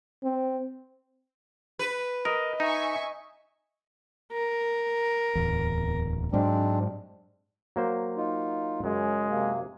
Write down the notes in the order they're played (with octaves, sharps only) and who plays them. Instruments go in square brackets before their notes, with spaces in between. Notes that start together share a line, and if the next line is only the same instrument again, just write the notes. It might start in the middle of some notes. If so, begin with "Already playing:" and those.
[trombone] C4
[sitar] B4
[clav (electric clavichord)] A#4 [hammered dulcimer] D#5
[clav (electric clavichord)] D#4 [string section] E5 G#5 C#6
[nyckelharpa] A#4
[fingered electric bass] D1 E2
[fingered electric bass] G#2 F#3 [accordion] G#3 C4 D4
[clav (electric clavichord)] F#3 A#3 C5
[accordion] D#4 F4
[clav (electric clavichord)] F#2 [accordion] C#3 [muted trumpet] G#3
[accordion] C3 A#3